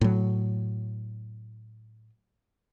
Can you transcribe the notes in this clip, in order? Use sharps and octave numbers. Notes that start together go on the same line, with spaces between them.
A2 F#3